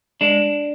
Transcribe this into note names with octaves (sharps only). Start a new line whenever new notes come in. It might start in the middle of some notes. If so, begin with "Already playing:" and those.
G#3 D4